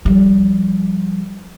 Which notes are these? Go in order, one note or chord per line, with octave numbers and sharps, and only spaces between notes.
F3 G3